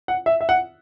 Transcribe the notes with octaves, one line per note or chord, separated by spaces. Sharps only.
F#5
E5
E5
F#5